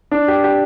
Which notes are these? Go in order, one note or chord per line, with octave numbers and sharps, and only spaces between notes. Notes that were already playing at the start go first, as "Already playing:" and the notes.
D4
G4
G4